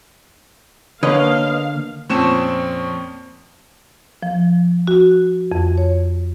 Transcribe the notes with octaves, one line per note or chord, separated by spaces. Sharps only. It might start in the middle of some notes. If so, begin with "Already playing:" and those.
D3 A#3 C#4 B4 D#5 F5
F2 A#2 C4 C#4 C#6 E7
F3
F#4
F2
C#5